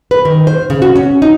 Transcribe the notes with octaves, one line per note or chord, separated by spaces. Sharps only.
B4
D#3
C5
C#3
F#4
C#4
D#4